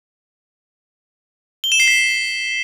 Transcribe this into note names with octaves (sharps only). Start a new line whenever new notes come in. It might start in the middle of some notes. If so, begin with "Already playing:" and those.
G7
E7
C7
B6